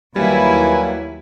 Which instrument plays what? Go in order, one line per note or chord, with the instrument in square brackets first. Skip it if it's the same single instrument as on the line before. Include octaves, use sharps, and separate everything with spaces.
[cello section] D#2 E4 [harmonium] F#3 A#3 [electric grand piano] G3 [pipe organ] B4 G#5